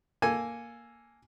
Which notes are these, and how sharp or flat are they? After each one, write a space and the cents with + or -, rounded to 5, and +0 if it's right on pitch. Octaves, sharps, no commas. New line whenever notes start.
A#3 +0 A4 +0 G#5 +0